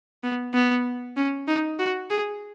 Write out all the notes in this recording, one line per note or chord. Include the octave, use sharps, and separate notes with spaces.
B3
B3
C#4
D#4
F#4
G#4